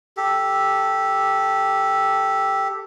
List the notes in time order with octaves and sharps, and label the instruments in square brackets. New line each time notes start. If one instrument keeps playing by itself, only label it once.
[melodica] G4 A4